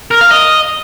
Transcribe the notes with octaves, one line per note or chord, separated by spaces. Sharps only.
A#4
F5
D#5